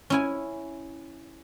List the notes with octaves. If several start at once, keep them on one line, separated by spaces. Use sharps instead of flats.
C#4 E4 G#5